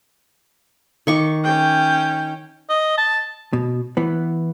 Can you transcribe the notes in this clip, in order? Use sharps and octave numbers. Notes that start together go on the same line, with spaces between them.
D#3 C#6 D6
C#4 G5
D#5
A5
B2
E3 B3